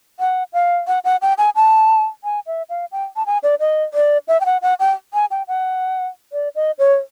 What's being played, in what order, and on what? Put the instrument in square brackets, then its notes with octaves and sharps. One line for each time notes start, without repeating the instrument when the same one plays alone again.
[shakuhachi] F#5
F5
F#5
F#5
G5
G#5
A5
G#5
E5
F5
G5
A5
G#5
D5
D#5
D5
E5
G5
F#5
F#5
G5
G#5
G5
F#5
D5
D#5
C#5